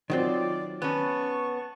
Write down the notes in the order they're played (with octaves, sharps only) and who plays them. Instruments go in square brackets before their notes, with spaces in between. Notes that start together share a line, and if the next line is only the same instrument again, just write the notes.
[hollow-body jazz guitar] D#3 F#3 C4 [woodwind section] F4 D5
[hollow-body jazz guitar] B3 C#4 [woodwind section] A5 C#6